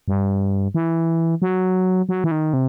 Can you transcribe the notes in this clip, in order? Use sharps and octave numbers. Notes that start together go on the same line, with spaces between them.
G2
E3
F#3
F#3
E3
D#3
C3